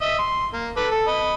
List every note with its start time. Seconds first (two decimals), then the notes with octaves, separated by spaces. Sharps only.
0.02 D#5 E5
0.19 C6
0.53 A#3
0.77 A4 B4 D6
0.91 A4
1.07 D#5 B5